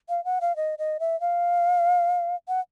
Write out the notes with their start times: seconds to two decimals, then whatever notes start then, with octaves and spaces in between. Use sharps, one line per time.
0.09 F5
0.25 F#5
0.41 F5
0.56 D#5
0.79 D#5
1.00 E5
1.21 F5
2.48 F#5